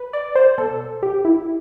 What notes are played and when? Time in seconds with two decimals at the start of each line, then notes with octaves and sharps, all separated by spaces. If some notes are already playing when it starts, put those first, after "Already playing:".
Already playing: B4
0.13 D5
0.35 C5
0.58 B2 A4
1.03 G4
1.25 E4